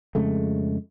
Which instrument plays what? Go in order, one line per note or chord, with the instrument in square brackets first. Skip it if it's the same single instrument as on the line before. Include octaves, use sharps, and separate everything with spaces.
[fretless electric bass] F2 C#3 G#3 A3